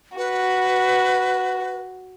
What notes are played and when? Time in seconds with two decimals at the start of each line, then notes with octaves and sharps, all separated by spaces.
0.17 F#4 B4